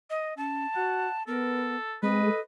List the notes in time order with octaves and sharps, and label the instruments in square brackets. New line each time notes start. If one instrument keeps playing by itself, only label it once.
[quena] D#5
[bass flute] C#4 [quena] A5
[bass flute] F#4 [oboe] F#5
[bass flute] B3 [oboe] A4 [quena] A#4
[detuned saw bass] G#3 [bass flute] C4 [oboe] B4 [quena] D#5
[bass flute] A4